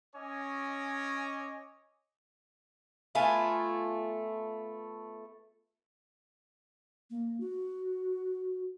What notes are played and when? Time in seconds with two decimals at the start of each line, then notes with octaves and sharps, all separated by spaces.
0.16 C#4 C#5 D#5 G#5 D6
3.15 A3 B3 F4 G#5
7.10 A#3
7.40 F#4